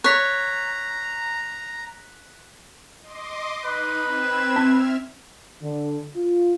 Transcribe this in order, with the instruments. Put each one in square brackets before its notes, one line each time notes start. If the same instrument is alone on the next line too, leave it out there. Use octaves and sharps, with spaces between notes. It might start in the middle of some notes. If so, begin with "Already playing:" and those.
[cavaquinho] C#5 [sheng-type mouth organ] A#5 [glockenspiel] F#6 B6
[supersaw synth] D#5 C6 D6
[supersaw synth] D#4 D#7 [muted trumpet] B4
[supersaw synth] C4 G#6 E7
[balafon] C4 [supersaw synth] E5 F6
[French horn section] D3
F4